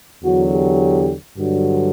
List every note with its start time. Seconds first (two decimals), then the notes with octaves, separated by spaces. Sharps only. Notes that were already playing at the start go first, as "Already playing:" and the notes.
0.24 E2 D3 F#3 F#4
0.53 G4
1.38 G2 D3 F#3 F#4